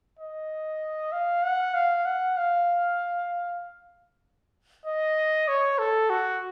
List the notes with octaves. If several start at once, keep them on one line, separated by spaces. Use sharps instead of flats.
D#5
F5
F#5
F5
F#5
F5
D#5
C#5
A4
F#4